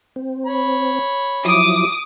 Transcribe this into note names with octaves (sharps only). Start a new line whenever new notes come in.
C4
C#5 B5
F3 F#3 E4 D6 D#6